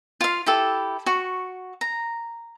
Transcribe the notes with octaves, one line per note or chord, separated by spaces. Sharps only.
F4 F5
E4 G4 A4
F#4 C#6
A#5